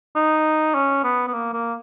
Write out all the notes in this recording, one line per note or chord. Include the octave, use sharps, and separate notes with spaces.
D#4
C#4
B3
B3
A#3
A#3